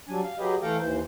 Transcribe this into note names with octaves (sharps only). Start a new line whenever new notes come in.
F#3 G3 D4 G#5
F5
F#3 G4 G#4 B4 D#5
E3 A3 A4 F5 G5 A#5
D#2 E3 C5